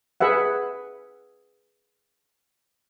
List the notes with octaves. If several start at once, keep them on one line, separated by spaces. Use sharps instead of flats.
G#4 B4 E5 F#5